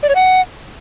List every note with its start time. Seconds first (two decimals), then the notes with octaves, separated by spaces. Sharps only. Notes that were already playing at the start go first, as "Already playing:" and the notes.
0.03 D5
0.09 C#5
0.15 F#5